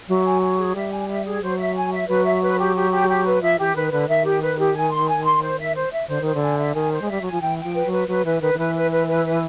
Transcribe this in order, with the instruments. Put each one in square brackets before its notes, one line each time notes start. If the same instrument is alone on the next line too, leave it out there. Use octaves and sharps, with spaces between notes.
[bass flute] F#3 [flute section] E5
[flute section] G#5
G#5
G#4
[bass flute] G3 [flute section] E5
[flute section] G#5
E5
G#4
[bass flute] F#3 [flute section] C5
[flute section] E5
G#5
E5
[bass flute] F#3 [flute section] B4
[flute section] E5
B4
G4
G4
G4
G4
B4
[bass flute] F3 [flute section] E5
[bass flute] E3 [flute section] G4
[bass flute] D#3 [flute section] B4
[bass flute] D3 [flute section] B4
[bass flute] D#3 [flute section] E5
[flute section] G4
B4
G4
G#5
C6
G#5
C6
C5
E5
C5
E5
[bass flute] D3 [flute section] C5
[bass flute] D#3 [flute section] C5
[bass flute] D3
[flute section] G#5
E5
[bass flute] D#3 [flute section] G#5
[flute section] C5
[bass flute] G#3
[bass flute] G3 [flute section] E5
[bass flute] F#3 [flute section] G#5
[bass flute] F3
[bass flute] E3 [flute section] G5
[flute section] G5
[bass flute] F3
[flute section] B4
[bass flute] F#3
[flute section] B4
[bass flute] F#3 [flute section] B4
[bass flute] E3 [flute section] B4
[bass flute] D#3 [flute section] B4
[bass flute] D#3
[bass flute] E3 [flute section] B4
[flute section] B4
B4
B4
B4